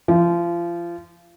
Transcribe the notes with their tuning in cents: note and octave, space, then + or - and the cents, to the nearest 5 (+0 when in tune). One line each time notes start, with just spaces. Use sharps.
F3 -30